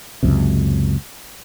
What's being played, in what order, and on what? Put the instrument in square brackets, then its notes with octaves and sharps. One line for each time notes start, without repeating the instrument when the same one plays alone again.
[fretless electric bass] C#2 F#2 C3